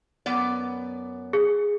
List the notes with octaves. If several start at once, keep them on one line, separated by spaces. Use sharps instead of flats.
F#2 B3 D5
G#4